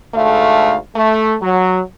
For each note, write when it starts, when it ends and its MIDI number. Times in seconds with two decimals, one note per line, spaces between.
0.14 0.76 38
0.14 0.76 44
0.14 0.76 57
0.14 0.76 77
0.94 1.35 57
1.41 1.80 54